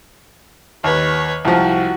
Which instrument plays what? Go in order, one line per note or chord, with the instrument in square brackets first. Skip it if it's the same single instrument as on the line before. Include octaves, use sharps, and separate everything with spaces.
[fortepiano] D#2 [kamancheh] B4 C#5
[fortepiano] C2 F3 [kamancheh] F#4